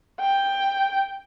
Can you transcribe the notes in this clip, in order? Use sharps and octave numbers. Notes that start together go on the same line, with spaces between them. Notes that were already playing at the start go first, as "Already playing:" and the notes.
G5